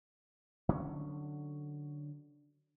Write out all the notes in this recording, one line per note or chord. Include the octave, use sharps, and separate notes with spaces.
D3 F#3 C#4